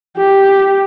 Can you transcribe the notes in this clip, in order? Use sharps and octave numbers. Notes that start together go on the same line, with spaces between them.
G4